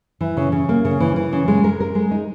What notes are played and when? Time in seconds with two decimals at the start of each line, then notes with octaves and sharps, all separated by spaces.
0.21 E3
0.37 C#3
0.52 C#3
0.69 A#3
0.85 C#3
1.00 E3
1.16 E3
1.33 C#3
1.48 G#3
1.64 A#4
1.80 A#4
1.95 G#3
2.11 D#4